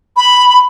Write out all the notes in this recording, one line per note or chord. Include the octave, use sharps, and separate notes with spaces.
B5